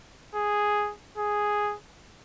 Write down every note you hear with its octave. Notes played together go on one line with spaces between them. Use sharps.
G#4
G#4